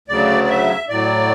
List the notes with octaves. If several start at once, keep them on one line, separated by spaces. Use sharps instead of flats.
D2 C#3 F#3 D5
D5
E5
A2 F#3 D5